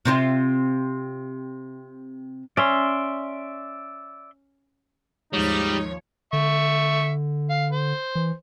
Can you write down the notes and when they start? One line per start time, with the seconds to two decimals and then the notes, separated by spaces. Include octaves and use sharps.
0.05 C3 C4 F4
2.57 C#4 D5 E5 C6
5.33 D#2 G#2 F3 G3 D#4 C#5
6.33 D3 E5 C#6
7.50 F5
7.72 C5
8.15 E3